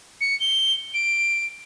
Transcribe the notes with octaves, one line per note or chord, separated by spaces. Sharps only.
C#7
G7
D7